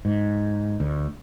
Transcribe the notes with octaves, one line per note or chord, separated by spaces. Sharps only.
G#2
D2